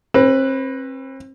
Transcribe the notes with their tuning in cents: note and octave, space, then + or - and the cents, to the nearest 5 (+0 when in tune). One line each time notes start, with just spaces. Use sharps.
C4 +35 B4 +0